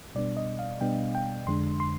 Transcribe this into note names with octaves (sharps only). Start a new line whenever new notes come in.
B2 G3 B3 D4 D5
D#5
F5
B2 G3 B3 D4 G5
G5
F2 D3 G#3 D4 C6
C6